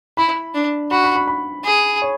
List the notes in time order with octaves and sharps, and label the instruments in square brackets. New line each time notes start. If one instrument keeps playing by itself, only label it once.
[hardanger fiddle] E4 [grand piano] B5
[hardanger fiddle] D4
[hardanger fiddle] F#4 [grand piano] B5
[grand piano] B5
B5
B5
[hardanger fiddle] G#4
[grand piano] C#5